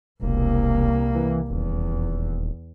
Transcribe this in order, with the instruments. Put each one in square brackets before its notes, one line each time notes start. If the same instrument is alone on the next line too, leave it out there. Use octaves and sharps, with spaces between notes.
[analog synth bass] E1 [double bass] C2 A#3
[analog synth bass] E3
[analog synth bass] D#1 [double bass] E2